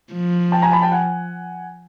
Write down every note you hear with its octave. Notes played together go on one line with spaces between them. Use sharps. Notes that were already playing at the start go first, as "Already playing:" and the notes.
F3
G5 A5
G#5 A#5
A5 B5
G5 A5
F#5 G#5